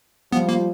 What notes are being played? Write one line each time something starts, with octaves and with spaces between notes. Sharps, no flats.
F3 G3 B3
A#3